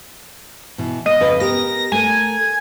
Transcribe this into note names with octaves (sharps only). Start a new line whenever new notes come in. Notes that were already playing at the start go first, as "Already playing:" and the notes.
B2 E3
A#3 D#5
F2 C#3 B4
B3 G4 A#4 A#6
A3 A#4 G#5